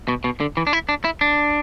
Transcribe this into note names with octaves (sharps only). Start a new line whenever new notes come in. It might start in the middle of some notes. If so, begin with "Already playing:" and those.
B2
B2
D3
E3
D4
E4
D4
E4
D4